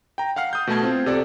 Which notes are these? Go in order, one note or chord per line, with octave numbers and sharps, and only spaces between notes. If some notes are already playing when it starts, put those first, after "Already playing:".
G5 A#5
F5 F#5 F6 C7
D#6 G6
B2 A3 A5 G#6
C4 F4
C3 A4 D5